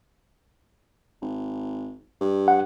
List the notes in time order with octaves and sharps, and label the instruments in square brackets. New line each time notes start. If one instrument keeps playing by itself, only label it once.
[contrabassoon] G#1
G2
[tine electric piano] F#5